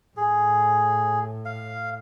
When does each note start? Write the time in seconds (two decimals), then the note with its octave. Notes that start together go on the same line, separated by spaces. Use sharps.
0.17 A2 G#4
1.45 F5